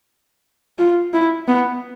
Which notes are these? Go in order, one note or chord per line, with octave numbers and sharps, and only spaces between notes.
F4
E4
B3